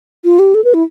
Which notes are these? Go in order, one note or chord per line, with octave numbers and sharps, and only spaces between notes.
F4
G4
A4
B4
E4